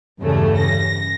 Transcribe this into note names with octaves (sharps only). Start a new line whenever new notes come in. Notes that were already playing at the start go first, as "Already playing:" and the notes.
E2 G2 C#3 G3 A3
A#6